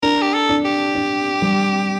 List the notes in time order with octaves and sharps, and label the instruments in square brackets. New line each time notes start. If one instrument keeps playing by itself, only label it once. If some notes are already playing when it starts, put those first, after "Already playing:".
[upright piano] D4 [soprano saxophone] A#4
[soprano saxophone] G4
A4
[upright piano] D4
[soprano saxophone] G4
[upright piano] D4
G3